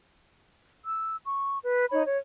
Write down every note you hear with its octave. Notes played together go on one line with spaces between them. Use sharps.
E6
C#6
B4
D#4 C#5 B5
C#5